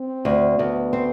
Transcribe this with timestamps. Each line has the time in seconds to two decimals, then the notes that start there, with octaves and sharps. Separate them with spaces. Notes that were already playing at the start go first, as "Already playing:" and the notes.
Already playing: C4
0.25 D2
0.59 D2 B3
0.93 C4